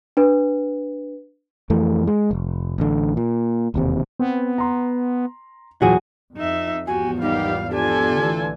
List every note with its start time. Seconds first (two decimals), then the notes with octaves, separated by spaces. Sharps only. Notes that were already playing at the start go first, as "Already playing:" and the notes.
0.17 D4 B4
1.70 F2 E3 A3
2.07 G#3
2.31 F1
2.78 A1 D3
3.17 A#2
3.74 E1 D#2 C3
4.19 B3 C4
4.58 A#5 C6
5.82 E2 A#2 F#3 F#4 G#4 D#7
6.37 F2 D#4 E5
6.87 G#1 E2 F3 F#4 G4 G#5
7.21 D#3 G3 B3 D#4 G4 F5
7.71 D4 F4 G4 A4 G#5
8.16 A1 D3 E3